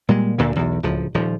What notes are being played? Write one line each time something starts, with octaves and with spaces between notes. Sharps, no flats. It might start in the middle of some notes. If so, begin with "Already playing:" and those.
A#2 G3 G#3
D2 A#2 D3
B1 E2
D1 C#2 F3
D#1 F3